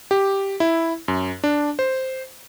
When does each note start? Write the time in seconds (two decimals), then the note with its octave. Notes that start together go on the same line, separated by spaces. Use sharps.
0.11 G4
0.60 E4
1.08 F#2
1.44 D4
1.79 C5